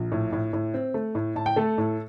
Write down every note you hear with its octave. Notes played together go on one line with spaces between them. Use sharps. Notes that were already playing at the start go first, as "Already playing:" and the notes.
Already playing: A#1
A2
A2
A2
C4
A3
A2
A2 A5
G5
A3 A4 A5
A2